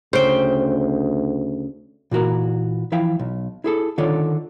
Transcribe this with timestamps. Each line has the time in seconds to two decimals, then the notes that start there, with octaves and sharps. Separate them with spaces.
0.13 D2 C#3 C5 G5
2.11 A#2 E3 F#4 A#4
2.92 E3 F3 E4 E5 F5 G5
3.19 B1
3.64 E4 G#4 A4
3.98 D3 D#3 F4 A4 C#5 D5